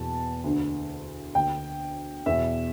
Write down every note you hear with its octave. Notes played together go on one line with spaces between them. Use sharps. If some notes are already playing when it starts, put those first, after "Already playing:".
Already playing: E2 B2 A5
D2 D3
D2 D3 G5
E2 B2 E5